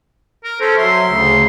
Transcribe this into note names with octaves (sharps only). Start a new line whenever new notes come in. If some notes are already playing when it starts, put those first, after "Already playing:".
A#4
C#4 A4 C5
F#3 E5 C6
D2 C#3